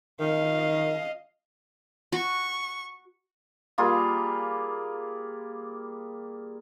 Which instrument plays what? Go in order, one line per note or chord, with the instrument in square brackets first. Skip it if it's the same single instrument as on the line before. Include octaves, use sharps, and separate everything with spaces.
[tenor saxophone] D#3 [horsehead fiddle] D#5 F5
[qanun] F#4 [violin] C#6
[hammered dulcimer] G3 A#3 F4 G#4